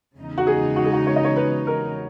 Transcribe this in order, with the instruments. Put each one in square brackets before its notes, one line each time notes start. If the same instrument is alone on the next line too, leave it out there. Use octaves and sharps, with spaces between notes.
[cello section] E2 C#3 G#3 D#4
[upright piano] F#4
G#4
F#4
G#4
F#4
C#5
D#5
C#5
B4
A#4